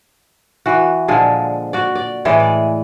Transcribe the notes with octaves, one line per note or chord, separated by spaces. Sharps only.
E3 F#4
A#2 D3 F3 G#3
F#4 D5
D5
A2 E3 G#3
D5